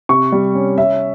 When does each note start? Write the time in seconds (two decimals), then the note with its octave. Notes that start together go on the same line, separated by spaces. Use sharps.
0.09 C3 C#6
0.32 G3
0.55 C#4
0.77 C#4 E5